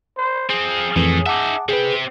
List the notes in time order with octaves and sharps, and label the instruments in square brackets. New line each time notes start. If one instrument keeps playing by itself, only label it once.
[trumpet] C5
[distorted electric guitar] F3 C4 [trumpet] G#4
[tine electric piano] F2 E3 [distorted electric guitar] A2 A3
[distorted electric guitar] D#4 E5 [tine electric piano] F#5 A5 D6
[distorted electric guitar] C4 G4 [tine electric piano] G#4 B4